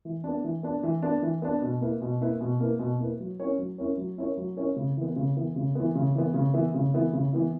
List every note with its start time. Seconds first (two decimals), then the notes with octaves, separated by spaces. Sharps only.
0.05 E3
0.24 B3 D4
0.44 E3
0.63 B3 D4
0.83 E3
1.02 B3 D4
1.22 E3
1.42 B3 D4
1.62 B2
1.81 A#3 E4 B4
2.02 B2
2.21 A#3 E4 B4
2.41 B2
2.60 A#3 E4 B4
2.79 B2
2.99 A#3 E4 B4
3.20 F#3
3.40 C#4 E4 A#4 C#5
3.58 F#3
3.78 C#4 E4 A#4 C#5
3.98 F#3
4.18 C#4 E4 A#4 C#5
4.37 F#3
4.57 C#4 E4 A#4 C#5
4.76 C#3
4.97 E3 B3
5.16 C#3
5.36 E3 B3
5.56 C#3
5.75 E3 B3
5.95 C#3
6.15 E3 B3
6.34 C#3
6.54 E3 B3 E4
6.74 C#3
6.94 E3 B3 E4
7.13 C#3
7.33 E3 B3 E4